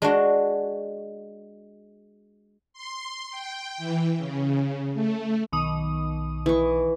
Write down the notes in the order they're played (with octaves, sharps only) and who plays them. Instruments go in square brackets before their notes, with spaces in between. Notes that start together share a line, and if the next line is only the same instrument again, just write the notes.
[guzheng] G#3 D4 F#4
[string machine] C6
G5
E3
C#3
A3
[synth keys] B1 D#3 D#6
[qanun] E3 C#6